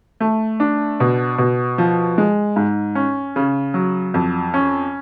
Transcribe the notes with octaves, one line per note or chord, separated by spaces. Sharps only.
A3
D4
B2
B2
F3
G#3
G#2
C#4
C#3
F#3
F2
C#4